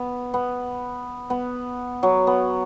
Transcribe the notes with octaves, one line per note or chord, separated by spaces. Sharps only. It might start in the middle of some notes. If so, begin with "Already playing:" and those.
Already playing: B3
B3
B3
F#3
B3